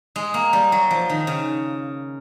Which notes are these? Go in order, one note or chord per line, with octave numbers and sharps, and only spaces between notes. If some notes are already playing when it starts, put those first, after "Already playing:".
G#3
A#3
G3
F#3
F3
D#3
C#3